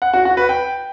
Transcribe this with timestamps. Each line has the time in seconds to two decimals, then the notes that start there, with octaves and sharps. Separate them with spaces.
0.02 F#5
0.13 F#4
0.25 F#4
0.37 B4
0.49 G5